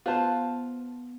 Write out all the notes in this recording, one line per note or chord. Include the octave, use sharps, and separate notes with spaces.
B3 F4 B4 C5 A5